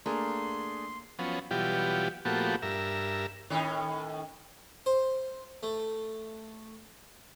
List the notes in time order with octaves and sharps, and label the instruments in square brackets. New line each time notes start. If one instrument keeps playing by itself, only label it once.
[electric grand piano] A3 D4 G#4 [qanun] A#3 [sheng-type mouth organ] C6
[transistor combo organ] F3 F#3 B3 C#4
B2 E3 F#3 G3 F4 G4
A#2 F3 A3 B3 F#4 G4
G2 A#4 E5
[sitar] A2 D#3 C#4
[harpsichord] C5
A3